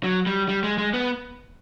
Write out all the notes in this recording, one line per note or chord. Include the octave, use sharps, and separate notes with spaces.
F#3
G3
G3
G#3
G#3
B3